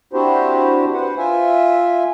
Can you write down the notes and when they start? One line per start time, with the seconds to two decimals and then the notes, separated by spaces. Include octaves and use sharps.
0.13 C4 D4 E4 F#4 G4 C5
0.94 B4 C5 F#5
1.18 F4 E5 G#5